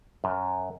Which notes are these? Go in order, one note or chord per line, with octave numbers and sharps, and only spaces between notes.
F#2